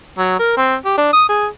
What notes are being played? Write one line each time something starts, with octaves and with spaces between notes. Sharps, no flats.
F#3
A#4
C4
G4
D4
D#6
G#4